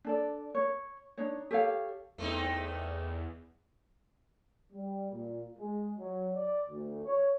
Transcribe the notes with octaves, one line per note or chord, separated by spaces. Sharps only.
D4 A4 D5
C#5
D4 D#4 C#5
G4 A4 C#5 F5
E2 A3 C4 D#4
G3
A#2
G#3
F#3
D5
D2
C#5